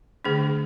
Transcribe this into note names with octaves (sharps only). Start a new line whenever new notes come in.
D3 A3 D4 G#4